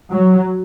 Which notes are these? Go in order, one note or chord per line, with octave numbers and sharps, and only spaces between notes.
F#3